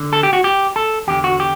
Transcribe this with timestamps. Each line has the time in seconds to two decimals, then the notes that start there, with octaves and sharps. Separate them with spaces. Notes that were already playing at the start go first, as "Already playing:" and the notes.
Already playing: D3
0.13 A4
0.23 G4
0.33 F#4
0.44 G4
0.76 A4
1.07 E2 D3 G4
1.24 F#4
1.40 G4